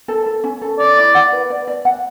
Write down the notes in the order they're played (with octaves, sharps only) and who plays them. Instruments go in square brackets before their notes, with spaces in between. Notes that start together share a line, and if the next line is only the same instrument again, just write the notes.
[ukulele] A4
A4
C#4
A4
[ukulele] C#5 [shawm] D5
[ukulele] E4
F#5
B4
D5
D5
F#5